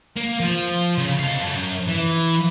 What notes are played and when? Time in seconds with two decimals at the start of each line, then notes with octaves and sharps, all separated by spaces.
0.17 A#3
0.40 F3
0.98 C#3
1.19 A4 F5
1.42 F#2
1.87 E3